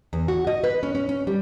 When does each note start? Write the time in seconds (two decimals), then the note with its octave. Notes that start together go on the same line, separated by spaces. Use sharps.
0.13 E2
0.28 F#4
0.47 D#5
0.64 B4
0.83 C#4
0.95 C#4
1.09 C#4
1.27 G3